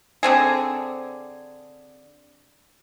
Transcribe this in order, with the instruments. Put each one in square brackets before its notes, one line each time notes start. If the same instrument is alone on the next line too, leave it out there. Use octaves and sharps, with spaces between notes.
[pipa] D3 C4 G#4